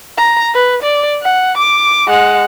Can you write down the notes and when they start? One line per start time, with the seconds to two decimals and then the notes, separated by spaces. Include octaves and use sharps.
0.18 A#5
0.54 B4
0.83 D5
1.22 F#5
1.57 D6
2.08 G#3 F#5